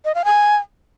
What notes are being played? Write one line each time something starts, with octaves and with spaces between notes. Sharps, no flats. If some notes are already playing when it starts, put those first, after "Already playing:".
D#5
F5
G#5